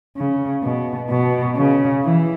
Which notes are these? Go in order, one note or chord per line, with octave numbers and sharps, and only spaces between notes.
C#3
B2
B2
C#3
E3